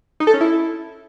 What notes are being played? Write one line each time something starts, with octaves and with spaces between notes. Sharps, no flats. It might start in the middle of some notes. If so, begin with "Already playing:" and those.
D#4
A4
C#4
E4